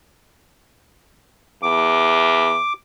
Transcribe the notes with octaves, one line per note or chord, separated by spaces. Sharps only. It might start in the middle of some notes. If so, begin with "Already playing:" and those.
E2 D6